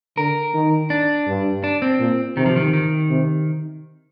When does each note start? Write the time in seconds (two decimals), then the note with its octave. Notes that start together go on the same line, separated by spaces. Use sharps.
0.17 D3 A#4
0.54 D#3
0.90 D4
1.28 G2
1.64 D4
1.82 C4
2.00 A#2
2.37 C3 D#3
2.46 F3
2.56 D#3
2.73 D#3
3.10 C3